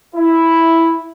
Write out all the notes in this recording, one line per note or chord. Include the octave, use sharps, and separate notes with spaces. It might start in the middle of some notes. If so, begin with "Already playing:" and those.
E4